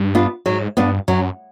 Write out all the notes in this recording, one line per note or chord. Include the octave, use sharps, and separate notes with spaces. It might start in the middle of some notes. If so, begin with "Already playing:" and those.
Already playing: G2
B3 D4 F4
G#2 F#3
G2 B3 D4 F4
F#2 F#3